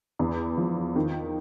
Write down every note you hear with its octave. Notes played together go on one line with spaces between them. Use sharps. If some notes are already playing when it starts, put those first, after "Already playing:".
E2
F3
D#3